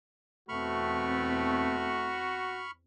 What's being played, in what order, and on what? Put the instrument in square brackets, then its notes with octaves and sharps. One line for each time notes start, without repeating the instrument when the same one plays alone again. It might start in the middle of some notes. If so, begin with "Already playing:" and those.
[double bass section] E2 C4 [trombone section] B2 A3 [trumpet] F#4 [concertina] B5 C#6 F6